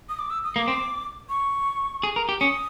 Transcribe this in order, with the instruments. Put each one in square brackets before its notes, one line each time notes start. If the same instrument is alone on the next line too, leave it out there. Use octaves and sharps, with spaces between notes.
[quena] D#6
D6
E6
D#6
[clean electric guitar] A#3 [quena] D#6
[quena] D6
[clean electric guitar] C4
[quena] C#6
[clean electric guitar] G#4
A#4
G4
[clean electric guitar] C#4 [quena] D#6